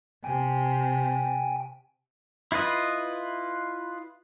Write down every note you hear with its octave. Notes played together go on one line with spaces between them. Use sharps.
C3 G5 G#5
E4 F4 B4 D#5